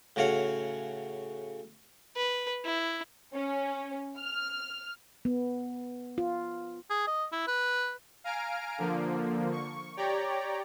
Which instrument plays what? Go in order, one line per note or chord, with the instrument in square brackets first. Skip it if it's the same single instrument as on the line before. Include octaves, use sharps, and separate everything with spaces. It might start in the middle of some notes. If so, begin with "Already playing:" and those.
[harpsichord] A2 C#3 F#4 C#5 F5 F#5
[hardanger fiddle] B4
E4
[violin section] C#4
F6
[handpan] B3
F4
[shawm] G#4
D#5
E4
B4
[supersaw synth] F5 G#5 A#5 F6 D7
D3 F3 A#3
C#6
G4 C#5 D5 G5 A#5